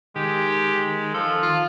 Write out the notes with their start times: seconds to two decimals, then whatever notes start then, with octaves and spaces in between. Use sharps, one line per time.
0.16 D#3 G#3 G4
1.14 F3 A4
1.43 F4